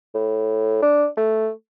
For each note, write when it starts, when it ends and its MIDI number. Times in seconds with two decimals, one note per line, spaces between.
0.14 0.78 45
0.82 1.06 62
1.17 1.50 57